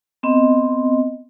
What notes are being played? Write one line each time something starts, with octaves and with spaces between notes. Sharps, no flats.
B3 C4 D#5